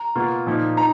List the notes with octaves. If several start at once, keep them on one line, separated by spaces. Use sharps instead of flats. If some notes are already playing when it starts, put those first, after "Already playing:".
Already playing: A#5
B2 A#3 F4
A#2 F3 A#3 D#4
D#4 A#5